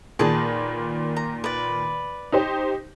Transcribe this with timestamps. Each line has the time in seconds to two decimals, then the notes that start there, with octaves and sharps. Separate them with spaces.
0.19 A#2 D#3 G#4 B4 A5
1.16 A#5
1.44 B4 D5
2.32 D#4 G4 C5